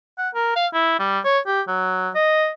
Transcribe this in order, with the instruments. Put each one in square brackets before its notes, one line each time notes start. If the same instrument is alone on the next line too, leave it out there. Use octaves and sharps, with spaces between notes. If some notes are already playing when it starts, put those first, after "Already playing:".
[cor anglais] F#5
A#4
F5
E4
G3
C#5
G4
F#3
D#5